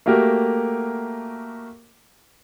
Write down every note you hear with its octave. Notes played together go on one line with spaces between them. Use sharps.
A3 A#3 F#4 G4 A#4